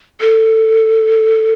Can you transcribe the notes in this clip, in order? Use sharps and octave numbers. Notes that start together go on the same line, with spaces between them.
A4